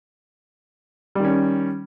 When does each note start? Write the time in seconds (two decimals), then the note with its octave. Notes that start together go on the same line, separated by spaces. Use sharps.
1.15 G3
1.20 D#3
1.25 C#4